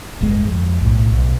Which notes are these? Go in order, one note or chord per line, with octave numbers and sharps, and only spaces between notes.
D1 G1 G#3
F2
B1 A2
B1